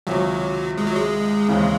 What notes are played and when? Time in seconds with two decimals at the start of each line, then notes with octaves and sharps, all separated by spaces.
0.07 C#2 C3 D#3 F#3
0.78 G#3
0.87 F#3
0.96 G#3
1.48 D#2 C#3 E3 C4 D#4